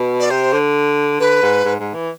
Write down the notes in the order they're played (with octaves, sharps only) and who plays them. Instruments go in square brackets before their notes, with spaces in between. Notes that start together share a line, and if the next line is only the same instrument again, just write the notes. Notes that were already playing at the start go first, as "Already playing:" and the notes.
Already playing: [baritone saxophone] B2
[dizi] D5
[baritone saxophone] C3 [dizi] C5
[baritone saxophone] D3
[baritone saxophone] D3 [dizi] B4
[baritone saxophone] G#2
G#2
G#2
E3